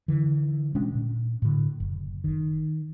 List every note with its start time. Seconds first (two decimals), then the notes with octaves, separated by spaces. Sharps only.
0.08 D3 E3
0.75 B2 G#3 C#4 D4
0.95 A#2
1.42 A2 D3
1.80 F#1
2.24 D#3